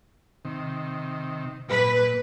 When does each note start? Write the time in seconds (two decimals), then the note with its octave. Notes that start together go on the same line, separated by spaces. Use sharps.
0.45 C3 D#3
1.69 A#2 B4